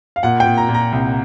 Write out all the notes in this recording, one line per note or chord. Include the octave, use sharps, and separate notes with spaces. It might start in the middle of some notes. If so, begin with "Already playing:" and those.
F5
A#2 F#5
G5
A#2
A#5
A#2
A#5
C2